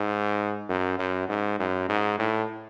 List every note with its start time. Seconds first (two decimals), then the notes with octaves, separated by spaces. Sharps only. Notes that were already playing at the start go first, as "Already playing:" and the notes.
Already playing: G#2
0.69 F#2
0.99 F#2
1.29 G#2
1.59 F#2
1.89 G#2
2.19 A2